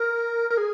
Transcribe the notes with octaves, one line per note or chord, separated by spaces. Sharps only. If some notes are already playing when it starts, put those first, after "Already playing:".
Already playing: A#4
A#4
G#4